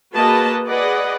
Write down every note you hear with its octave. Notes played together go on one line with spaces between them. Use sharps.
A#3 F#4 G#4 B4 D#5 A5
G#4 B4 D5 D#5 F#5